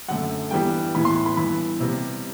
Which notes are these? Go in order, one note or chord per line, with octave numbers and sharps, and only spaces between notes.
F#2 D3 A3 F#5
G2 E3 G3 B3 G5
A2 E3 B3 B5
C6
C6
B5
G2 E3 B3 B5
C3 G3 B3